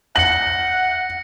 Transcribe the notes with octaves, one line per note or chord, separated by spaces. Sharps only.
F#5 A#6 C#7 F#7